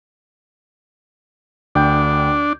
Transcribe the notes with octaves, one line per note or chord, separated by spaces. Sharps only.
D2 D4 G5 G6